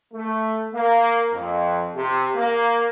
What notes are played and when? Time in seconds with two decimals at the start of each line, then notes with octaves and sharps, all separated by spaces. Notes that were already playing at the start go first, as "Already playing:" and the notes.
0.14 A3
0.73 A#3
1.33 F2
1.95 C3
2.35 A#3